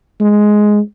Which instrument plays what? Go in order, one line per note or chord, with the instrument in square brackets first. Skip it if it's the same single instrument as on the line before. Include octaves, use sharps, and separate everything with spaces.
[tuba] G#3